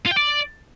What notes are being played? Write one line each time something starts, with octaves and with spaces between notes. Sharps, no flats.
F4
G5
D5